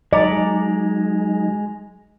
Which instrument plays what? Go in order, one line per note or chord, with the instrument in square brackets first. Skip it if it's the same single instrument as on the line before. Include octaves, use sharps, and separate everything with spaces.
[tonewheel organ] F#3 D#4 G#4 [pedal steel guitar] G#3 A#5 [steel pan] D5 [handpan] D#5